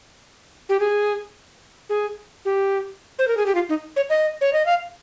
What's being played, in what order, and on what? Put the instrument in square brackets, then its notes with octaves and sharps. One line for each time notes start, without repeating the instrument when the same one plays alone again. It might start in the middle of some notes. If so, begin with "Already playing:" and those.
[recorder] G4
G#4
G#4
G4
C5
A#4
G#4
G4
F4
D#4
C#5
D#5
C#5
D#5
F5